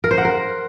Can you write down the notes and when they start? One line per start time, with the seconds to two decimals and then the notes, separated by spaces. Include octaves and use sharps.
0.04 A#4
0.11 C5
0.18 F#5
0.25 A#4